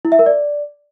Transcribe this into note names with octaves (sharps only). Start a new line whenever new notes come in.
E4
E5
A#4
D5